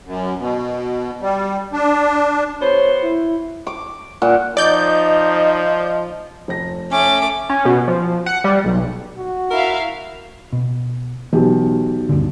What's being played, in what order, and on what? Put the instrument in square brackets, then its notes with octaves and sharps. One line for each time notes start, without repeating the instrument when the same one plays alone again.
[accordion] F#2
B2
G3
D4
[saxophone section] B3 F#4 C5 [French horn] C#5
[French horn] E4
[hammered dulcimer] D6
A#2 F#5
[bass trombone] F3 [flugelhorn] D#4 [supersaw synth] D5 G6 [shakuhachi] D#5
[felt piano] F1 A#6
[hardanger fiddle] A3 D6 [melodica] C#4
[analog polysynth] C#4
B2
F3
F#5
G3
B1
[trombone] F#4
[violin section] E4 E5 F5 [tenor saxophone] A#4
[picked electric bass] B2
[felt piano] B1 G4 [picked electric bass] E3
[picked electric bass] D2 G2 D3